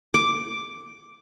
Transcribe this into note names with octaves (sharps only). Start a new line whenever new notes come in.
D6